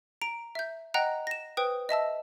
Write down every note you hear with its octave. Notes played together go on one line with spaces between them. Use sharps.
A#5 D7
E5 G6
D#5 F#5 G5 A#5 F#6
A#6 E7
B4 C5 G5 D#6
D#5 E5 A5 E6